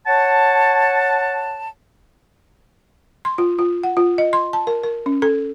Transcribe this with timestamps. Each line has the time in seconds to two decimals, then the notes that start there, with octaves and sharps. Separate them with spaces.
0.07 C#5 F#5 A5
3.25 C6
3.38 F4
3.59 F4
3.84 F#5
3.97 F4
4.18 D#5
4.33 C6
4.53 A5
4.67 A#4
4.83 A#4
5.06 C#4
5.22 A4